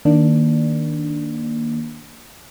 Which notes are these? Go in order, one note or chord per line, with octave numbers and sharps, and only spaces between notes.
D#3 A#3 D4